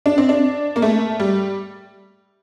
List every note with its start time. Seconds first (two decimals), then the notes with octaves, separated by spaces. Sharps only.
0.06 D4
0.18 C4
0.29 D4
0.76 A#3
0.82 A3
1.20 G3